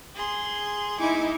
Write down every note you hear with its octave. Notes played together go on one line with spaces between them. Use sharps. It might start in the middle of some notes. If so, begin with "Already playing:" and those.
G#4 C6
D#4 E4 G#5 D6